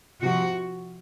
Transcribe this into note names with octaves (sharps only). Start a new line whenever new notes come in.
C3 F3 F#4